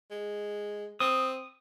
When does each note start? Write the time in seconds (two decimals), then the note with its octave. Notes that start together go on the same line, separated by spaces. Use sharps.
0.10 G#3
1.00 C4 D#6